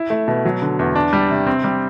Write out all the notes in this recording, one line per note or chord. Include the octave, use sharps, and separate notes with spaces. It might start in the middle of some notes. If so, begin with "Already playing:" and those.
Already playing: E4
A3
B2
F#3
D3
E2
D4
G3
C3
C4
G3